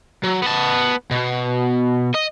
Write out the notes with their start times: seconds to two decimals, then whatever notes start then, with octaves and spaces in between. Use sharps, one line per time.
0.23 F#3
0.42 B3 A5
1.11 B2
2.15 D#5